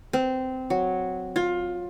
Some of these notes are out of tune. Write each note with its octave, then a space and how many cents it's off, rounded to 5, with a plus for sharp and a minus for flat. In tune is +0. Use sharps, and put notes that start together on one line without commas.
C4 -15
F#3 -5
F4 +20